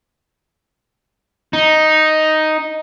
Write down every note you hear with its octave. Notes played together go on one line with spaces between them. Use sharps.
D#4